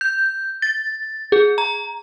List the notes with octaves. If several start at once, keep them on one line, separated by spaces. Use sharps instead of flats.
G6
A6
G#4
A#5